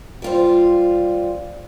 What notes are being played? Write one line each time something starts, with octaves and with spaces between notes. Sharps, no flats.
G3 F4 C5